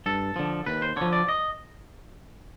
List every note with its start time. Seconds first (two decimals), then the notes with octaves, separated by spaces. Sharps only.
0.06 G2 A4
0.36 D3 F3
0.66 D#2 B4
0.82 C5
0.96 D3 F3 C#5
1.13 D5
1.29 D#5